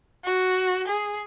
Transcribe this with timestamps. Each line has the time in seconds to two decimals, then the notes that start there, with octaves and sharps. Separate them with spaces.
0.24 F#4
0.87 G#4